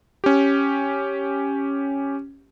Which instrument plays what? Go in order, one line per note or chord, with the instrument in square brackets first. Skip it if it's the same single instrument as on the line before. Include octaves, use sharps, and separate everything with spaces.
[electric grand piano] C#4 G4